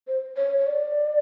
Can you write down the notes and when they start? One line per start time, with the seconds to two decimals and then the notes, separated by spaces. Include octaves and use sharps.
0.07 C5
0.37 C#5
0.59 C#5
0.67 D5